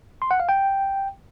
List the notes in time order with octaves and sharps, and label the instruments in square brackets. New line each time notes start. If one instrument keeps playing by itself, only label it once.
[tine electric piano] C6
F#5
F5
G5